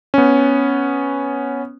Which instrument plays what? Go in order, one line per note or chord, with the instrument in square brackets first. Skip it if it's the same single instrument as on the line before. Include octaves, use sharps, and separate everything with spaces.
[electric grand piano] B3 C#4